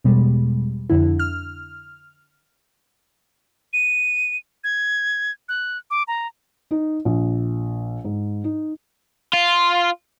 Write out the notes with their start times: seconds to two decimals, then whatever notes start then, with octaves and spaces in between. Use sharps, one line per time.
0.04 E2 B2 G3 G#3
0.90 F2 D3 E4
1.19 F6
3.73 D#7
4.64 G#6
5.49 F#6
5.91 D6
6.08 A#5
6.71 D#4
7.05 A#1
8.05 G#2
8.44 D#4
9.33 F4